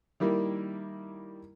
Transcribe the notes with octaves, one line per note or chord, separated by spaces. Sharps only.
D#3 G3 A#3 E4